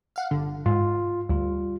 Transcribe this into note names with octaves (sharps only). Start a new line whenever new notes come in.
F5 F#5
G1 D3
G#2 F4
D2 G3 F4